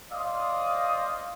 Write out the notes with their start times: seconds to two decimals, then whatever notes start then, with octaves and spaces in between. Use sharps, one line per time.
0.12 C5 D5 D#5 F5 D#6